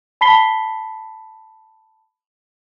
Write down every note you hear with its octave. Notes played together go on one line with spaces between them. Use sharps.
A5 B5 B6 C7 G7